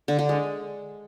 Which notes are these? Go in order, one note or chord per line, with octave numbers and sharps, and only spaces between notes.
D3
D3
G#3